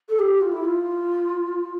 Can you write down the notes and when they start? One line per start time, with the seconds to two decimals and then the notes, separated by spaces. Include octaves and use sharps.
0.09 A4
0.19 G4
0.41 F4
0.52 E4
0.64 F4